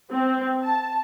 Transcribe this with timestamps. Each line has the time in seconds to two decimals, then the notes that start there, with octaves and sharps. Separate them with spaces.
0.11 C4
0.62 A5